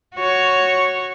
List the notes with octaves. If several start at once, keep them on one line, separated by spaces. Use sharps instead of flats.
F#4 C#5